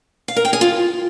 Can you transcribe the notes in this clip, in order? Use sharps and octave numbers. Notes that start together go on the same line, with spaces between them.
F5
A#4
G5
G#4
F4